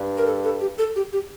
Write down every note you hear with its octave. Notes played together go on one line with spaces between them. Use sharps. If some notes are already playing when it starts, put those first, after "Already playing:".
Already playing: G2
A#4
A4
A4
G4
A4
G4
G4